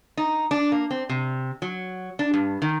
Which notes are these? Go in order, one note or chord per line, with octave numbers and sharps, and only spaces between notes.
D#4
D4
A#3
C4
C3
F#3
D4
G2
D#3